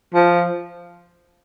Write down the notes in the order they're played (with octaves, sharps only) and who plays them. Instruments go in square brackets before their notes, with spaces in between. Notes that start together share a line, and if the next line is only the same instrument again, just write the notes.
[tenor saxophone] F3